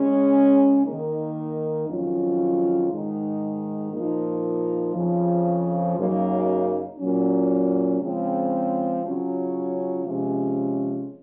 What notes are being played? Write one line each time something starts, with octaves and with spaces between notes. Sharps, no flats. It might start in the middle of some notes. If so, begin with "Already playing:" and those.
Already playing: C#3 G#3 C#4
D#3 A#3 D#4
F2 D#3 F#3 C#4 F4
G#2 D#3 G#3 D#4
A#2 F3 A#3 D#4
F2 C#3 F3
F#2 C#3 F#3 A#3 D#4
A#2 F#3 C#4
C#3 F3 G#3 C4
C#3 F#3 C#4 F4
C3 F3 G#3 C#4